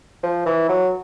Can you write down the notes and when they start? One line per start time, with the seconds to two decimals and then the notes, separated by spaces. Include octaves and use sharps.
0.23 F3
0.46 E3
0.69 F#3